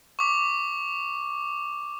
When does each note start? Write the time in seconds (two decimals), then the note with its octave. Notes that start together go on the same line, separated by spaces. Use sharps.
0.19 C#6 D6